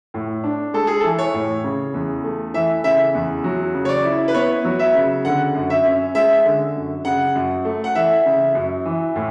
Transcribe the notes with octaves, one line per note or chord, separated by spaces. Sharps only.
A2
D4
G#3 A4
G#4
A4
E3
C#5
A2
C#3
E2
A3
E3 E5
C#3 E5
E2
F#3
C#3
C#5
D5
E4
B4
B3 C#5
F#3
E5
C#3
D3 F#5
F#2
E5
C#4
G#3 E5
D3
F#2
C#3 F#5
F#2
A3
F#5
E3 E5
C#3
F#2
E3
A2